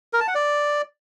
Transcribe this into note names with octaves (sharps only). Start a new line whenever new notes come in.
A#4
A5
F#5
D5